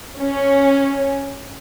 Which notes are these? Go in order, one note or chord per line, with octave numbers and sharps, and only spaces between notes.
C#4